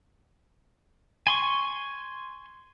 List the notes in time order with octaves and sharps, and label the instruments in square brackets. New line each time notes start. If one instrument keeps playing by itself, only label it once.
[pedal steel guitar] G#5 C6 C#6